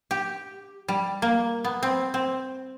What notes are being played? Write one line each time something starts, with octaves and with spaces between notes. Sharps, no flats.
G4
G3
A#3
B3
C4
C4